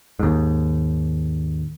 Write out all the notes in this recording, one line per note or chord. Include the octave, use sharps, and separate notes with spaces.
D#2 G#2